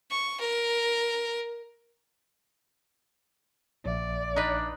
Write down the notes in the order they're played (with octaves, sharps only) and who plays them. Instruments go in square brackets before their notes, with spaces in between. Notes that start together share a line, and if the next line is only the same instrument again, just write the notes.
[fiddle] C#6
A#4
[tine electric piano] A#1 E5 [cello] D5
[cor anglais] D4 [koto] D#4 B4